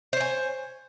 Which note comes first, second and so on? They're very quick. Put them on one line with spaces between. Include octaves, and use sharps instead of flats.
C5 C#5 G#5